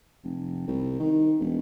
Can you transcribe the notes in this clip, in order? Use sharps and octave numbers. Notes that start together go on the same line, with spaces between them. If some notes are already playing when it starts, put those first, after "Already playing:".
F1
C2
D#3
E1